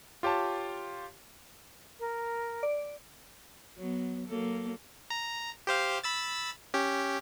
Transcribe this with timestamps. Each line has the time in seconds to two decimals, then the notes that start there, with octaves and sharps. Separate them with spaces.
0.23 F4 G4 C#5 A5
1.99 A#4
2.63 D5
3.77 F#3 B3
4.27 F#3 A#3 A4
5.10 A#5
5.67 G4 C5 F5
6.04 B5 E6 A6
6.74 C#4 G4